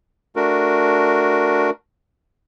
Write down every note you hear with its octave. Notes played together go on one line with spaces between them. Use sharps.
A3 D4 F#4 A#4